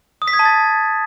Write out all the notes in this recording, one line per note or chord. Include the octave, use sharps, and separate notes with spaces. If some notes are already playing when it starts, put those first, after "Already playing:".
D#6
B6
G#6
A5
A6